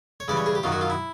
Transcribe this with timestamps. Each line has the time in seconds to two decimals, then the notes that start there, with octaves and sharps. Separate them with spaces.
0.20 C#5
0.28 C#3 E3 G3 D5
0.37 C#5
0.46 G#4
0.55 G4
0.63 F#2 D#3 F#3 F4
0.72 F#4
0.81 F4
0.90 E4